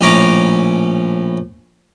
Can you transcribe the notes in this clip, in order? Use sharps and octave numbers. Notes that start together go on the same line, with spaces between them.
A#1 A2 C#4 C#5 A#5 D6